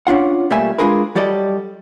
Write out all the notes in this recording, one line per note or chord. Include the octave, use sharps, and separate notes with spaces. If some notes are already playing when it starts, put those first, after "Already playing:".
C#4 D4 F4 F#5
B1 G3 A3 A#3 E5 G#5
G#3 D4 F4 G#4 A#4 B4
F#3 G3 A4 D5 D#5